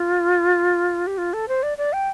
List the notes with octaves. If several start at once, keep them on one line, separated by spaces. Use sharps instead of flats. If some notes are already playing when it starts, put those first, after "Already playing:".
Already playing: F4
G4
F4
A4
C5
D5
D5
G5